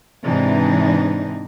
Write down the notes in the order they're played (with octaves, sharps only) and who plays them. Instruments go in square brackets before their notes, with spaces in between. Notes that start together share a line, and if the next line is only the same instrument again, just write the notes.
[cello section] G#2 C3 E3 D4 D#4